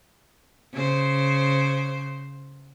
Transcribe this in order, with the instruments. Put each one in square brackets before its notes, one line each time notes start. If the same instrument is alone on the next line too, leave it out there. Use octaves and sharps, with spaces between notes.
[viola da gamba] C#3 C5